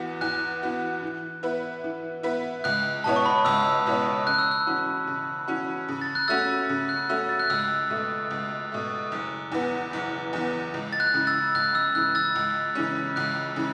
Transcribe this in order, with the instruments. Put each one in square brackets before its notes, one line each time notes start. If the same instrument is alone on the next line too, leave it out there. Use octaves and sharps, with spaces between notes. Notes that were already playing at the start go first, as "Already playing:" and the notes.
Already playing: [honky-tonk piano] E2 E3 B3 F#4
[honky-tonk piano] E2 [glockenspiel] F#6
[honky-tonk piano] E3 B3 F#4
E3
B3 E4 B4 E5
E3
B3 E4 B4 E5
[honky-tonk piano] C#2 [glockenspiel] F#6
[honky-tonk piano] B2 B3 E4 C#5 [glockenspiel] A5
[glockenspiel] C#6
B5
[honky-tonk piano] C#2 [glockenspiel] E6
[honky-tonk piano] B2 B3 E4 C#5
[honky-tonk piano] C#3 [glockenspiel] F#6
[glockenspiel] E6
F#6
[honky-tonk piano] E3 C#4 F#4
C#3
E3 C#4 F#4
C#3
[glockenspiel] A6
F#6
[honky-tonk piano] A3 C#4 F#4 [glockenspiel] E6 A6
[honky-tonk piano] C#3
[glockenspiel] F#6
[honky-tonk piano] A3 C#4 F#4 [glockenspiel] E6
[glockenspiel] A6
F#6
[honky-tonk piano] C#2 [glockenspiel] E6
[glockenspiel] F#6
[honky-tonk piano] B2 A3
C#2
B2 A3
F#1
E2 E3 B3
F#1
E2 E3 B3
C#2
[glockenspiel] A6
F#6
[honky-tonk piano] C#3 E3
[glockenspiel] E6 A6
[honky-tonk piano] C#2 [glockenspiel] F#6
[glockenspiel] E6 A6
[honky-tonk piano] C#3 E3 [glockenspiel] F#6
[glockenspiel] E6 A6
[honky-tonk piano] C#2
C#3 E3 C#4
[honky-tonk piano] C#2 [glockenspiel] F#6
[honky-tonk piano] C#3 E3